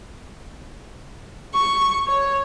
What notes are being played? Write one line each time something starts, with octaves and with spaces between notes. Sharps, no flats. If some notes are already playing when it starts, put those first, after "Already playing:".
C#6
C#5